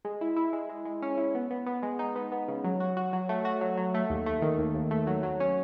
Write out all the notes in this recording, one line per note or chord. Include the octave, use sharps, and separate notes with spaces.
G#3
E4
E4
G#3
G#3
G#3
C#4
E4
B3
B3
B3
G#3
D#4
B3
B3
C#3
F#3
F#4
F#4
F#3
A3
F#4
F#3
F#3
A3
D#2
A3
D#3
D#2
D#2
A3
F#3
F#3
C#4